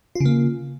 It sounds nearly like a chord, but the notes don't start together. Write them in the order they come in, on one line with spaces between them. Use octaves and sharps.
F4 C#3 A#3